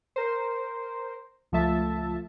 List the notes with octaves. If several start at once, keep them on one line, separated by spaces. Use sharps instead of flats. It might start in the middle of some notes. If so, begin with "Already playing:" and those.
A#4 C5
C#2 F3 A3 E5 A5